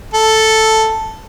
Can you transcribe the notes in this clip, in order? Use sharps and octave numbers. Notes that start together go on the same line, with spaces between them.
A4